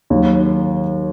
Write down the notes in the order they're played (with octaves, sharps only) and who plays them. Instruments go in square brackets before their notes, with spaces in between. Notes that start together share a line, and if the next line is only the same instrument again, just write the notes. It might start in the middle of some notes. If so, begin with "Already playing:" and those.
[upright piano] D#2 D#3 F#3